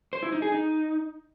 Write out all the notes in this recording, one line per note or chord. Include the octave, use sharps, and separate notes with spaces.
C5
E4
D#4
G#4
D#4